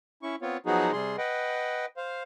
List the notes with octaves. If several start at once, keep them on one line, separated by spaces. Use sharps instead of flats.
C#4 E4 C#6
B3 C4 F4 C#5
F3 F#3 B3 D#4 F#4 G#4
C3 G3 G#4 C6
B4 D#5 F#5 G5
C5 F5